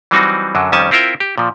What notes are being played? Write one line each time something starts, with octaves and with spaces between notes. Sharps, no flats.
E3 F#3 G3 C4 D#4 F#4
F#2 D3 F#3
F2 D#3 G3 C#4 G#5 A5
C4 E4 F4 A#4 E5 G5
G4
A#2 F3